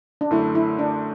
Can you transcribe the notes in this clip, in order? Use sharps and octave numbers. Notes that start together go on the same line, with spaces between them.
D4
F#2 D3 A3 E4
E4
D4